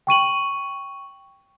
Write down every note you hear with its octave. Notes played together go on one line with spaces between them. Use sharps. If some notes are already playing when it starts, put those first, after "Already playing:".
G5 C#6 D#7 F#7